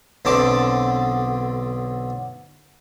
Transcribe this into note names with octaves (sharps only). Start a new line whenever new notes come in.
B1 D3 C4 A5 D6